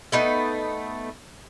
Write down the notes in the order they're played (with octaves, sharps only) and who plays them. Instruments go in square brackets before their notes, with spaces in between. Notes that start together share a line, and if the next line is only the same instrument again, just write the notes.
[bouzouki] A3 B3 D#4